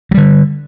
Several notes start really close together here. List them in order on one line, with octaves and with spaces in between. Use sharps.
F#3 G3 D3